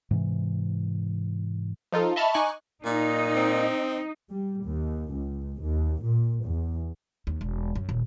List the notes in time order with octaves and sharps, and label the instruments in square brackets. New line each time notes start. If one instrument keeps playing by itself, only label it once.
[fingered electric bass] G#2 C3 E3
[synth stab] F3 D#4 F4 A4
D#5 E5 A5 B5 C#6 F6
D#4 G#5 C#6 D6 F#6
[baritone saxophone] A#2 [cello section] D#4
[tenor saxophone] C4
[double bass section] G3
D#2
C#2
D#2
A#2
E2
[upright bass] D#2
E1
F#2
D#1